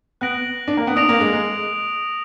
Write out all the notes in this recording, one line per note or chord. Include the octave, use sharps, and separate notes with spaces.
B3 F#6 A#6 D7 F#7
D4
A#3
B3
D4 D#6 A#6 D7 F7
A#3
G#3
G#3